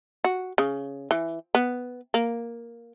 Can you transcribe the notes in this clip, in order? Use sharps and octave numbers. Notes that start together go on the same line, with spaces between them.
F#4
C#3
E3
B3
A#3